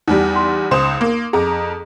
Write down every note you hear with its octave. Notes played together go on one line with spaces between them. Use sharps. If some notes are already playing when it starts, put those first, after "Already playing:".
E2 G3 D#4
C6
C#2 C5 C6 D#6 E7
A#3
F2 G#4 A#5